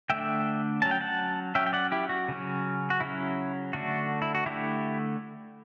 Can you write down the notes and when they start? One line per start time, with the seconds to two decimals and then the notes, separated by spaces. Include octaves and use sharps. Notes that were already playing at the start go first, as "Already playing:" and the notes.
0.10 D3 A3 D4 E5 G5
0.82 F#3 C#4 A5
0.91 G5
1.01 F#5 A5
1.55 F#3 C#4 E5 G5
1.66 G5
1.73 D5 F#5
1.92 E4 G4
2.09 F#4
2.28 C#3 F#3 C#4
2.90 F#4
3.00 C#3 F#3 C#4 E4
3.73 D3 A3 D4 F#4
4.22 E4
4.35 F#4
4.46 D3 A3 D4 E4 G4